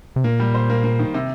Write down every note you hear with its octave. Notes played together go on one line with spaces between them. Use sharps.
C3
A#2 A#3
G3
C5
A#3
A#3
D#3
C3